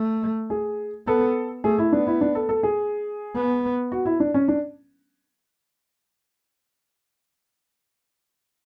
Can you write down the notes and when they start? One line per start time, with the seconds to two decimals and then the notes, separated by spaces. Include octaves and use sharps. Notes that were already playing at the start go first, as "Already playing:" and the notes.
Already playing: A3
0.50 G#4
1.07 B3 A4
1.64 A3 G#4
1.78 E4
1.92 B3 D4
2.07 E4
2.21 D4
2.35 A4
2.49 A4
2.63 G#4
3.35 B3
3.92 F#4
4.05 E4
4.20 D4
4.34 C#4
4.48 D4